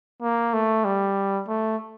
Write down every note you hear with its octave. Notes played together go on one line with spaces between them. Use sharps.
A#3
A3
G3
A3